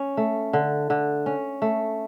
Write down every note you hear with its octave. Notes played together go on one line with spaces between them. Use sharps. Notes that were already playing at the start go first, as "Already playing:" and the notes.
Already playing: C#4
A3
D3
D3
C#4
A3